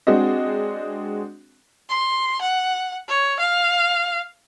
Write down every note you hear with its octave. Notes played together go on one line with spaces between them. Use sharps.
G#3 C4 D4 F#4 D#5
C6
F#5
C#5
F5